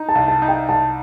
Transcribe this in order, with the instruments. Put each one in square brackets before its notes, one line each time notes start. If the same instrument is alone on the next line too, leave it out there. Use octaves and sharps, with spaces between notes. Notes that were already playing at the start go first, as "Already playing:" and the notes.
Already playing: [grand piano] D#4
[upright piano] A5
[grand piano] C2
[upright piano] A5
[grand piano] D#4
[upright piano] G5
[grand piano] C2 [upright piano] A5